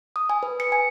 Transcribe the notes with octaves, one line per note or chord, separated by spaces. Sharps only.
D#6
G#5
B4
C#7
G#5